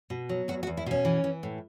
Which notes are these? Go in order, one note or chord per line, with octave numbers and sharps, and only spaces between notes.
B2
F#3
E2 F#4
F#4
E2
E4
B2 C#4
E3
E3
A2